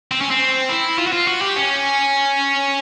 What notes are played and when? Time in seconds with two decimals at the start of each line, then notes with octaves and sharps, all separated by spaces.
0.11 C4
0.21 C#4
0.31 C4
0.69 E4
0.98 F4
1.07 F#4
1.13 F4
1.27 F#4
1.41 G4
1.56 C#4